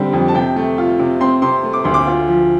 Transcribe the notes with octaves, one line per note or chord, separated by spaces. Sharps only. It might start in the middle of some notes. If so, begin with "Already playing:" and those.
Already playing: D3 G3 C4
F2
A5
C3 G5
A3
F4
C3
C4 C6
C3 C6
A3
D6
D2 C6
D6
F4
F3